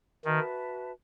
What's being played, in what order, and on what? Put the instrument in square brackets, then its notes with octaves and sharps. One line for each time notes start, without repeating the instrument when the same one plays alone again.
[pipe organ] D#3 [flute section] F#4 B4 E5 A5